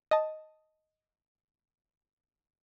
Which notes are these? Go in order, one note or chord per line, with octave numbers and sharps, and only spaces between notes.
D#5 A5